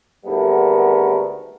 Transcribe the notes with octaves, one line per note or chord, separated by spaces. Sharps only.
G#1 D2 G3 A3 B3 A#4